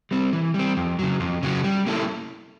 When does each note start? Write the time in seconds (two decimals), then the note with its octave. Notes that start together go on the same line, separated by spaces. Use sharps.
0.11 G3 C4
0.33 E3
0.54 G3
0.59 C4
0.77 F2
0.99 C#3 F#3
1.20 F2
1.43 C#3 F#3
1.64 G3
1.87 A#3 C#4 E4 A4